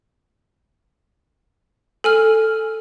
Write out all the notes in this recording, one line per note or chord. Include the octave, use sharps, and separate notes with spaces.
A4 G#5 F6